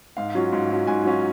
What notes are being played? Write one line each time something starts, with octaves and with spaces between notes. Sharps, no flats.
G#2 F5
F#3 C#4 F4
G#2
F#3 C#4 F4
G#2 G#5
F#3 C#4 F4